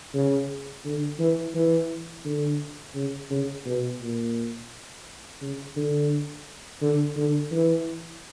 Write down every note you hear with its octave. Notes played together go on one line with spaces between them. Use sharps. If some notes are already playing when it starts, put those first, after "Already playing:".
C#3
D3
E3
E3
D3
C#3
C#3
B2
A#2
C#3
D3
D3
D3
E3